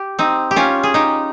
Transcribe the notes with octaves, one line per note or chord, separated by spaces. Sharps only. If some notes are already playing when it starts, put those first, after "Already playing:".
Already playing: G4
C4 D#4
G4
C#4 F4
G#4
D#4 G4